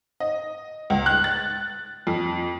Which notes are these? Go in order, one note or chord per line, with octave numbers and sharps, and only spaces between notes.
D#5
C#2
F#6
A6
F2